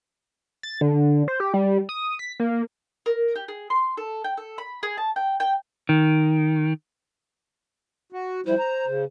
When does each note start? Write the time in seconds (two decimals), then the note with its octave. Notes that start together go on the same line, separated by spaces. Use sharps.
0.63 A6
0.81 D3
1.28 C5
1.40 G4
1.54 G3
1.89 D#6
2.19 B6
2.40 A#3
3.06 A#4
3.36 G4
3.48 G#4
3.70 C6
3.97 A4
4.24 G5
4.37 A4
4.58 B5
4.83 G#4
4.97 A5
5.16 G5
5.40 G5
5.89 D#3
8.13 F#4
8.46 F3 G3 E4 C5
8.59 A#5
8.86 C#3